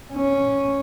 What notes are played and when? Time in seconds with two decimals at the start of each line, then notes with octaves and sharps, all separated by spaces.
0.14 C#4